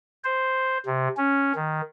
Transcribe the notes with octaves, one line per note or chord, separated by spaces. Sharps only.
C5
C3
C#4
D#3